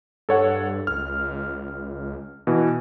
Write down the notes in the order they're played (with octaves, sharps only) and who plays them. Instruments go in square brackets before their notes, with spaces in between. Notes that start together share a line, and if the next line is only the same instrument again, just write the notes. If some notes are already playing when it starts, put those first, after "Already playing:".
[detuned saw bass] G2 [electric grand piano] A4 C#5 F#5
[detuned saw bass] C#2 [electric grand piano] F6
[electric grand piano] B2 E3